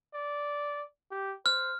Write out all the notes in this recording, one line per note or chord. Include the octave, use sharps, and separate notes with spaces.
D5
G4
C5 F6